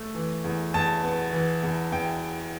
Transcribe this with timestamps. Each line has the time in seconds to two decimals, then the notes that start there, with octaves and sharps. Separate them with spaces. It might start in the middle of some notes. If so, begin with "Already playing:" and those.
Already playing: A3
0.15 E3
0.44 E2
0.74 E2 A5
1.03 B3
1.33 E3
1.63 E2
1.92 E2 G5